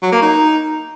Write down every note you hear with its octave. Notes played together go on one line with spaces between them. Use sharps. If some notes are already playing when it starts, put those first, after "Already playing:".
F#3
A#3
D#4